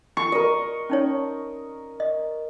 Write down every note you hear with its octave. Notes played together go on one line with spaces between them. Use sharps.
C#6
A#4 D#5
C#4 D#4 C#5
D#5